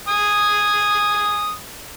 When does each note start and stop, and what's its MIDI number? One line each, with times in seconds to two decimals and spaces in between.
0.08 1.53 80
0.08 1.53 87